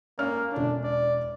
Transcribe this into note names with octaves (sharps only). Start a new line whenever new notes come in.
A#3 C#4 F6
E1 C#4 D4
D5